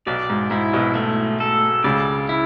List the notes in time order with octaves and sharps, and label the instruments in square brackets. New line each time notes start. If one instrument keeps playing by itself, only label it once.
[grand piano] B1 B2 [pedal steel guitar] D5
[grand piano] G#2
[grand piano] G#2 [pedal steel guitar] E4
[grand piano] B1 B2
[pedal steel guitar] A3
A4
[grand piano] C#2 C#3 [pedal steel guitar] D5
[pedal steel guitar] E4